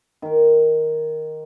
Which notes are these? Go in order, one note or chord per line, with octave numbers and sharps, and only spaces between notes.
D#3 A#4